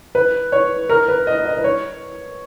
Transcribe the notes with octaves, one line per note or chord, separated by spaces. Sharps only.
B4
C#5
A#4
B4
D#5
D#5
B4
C#5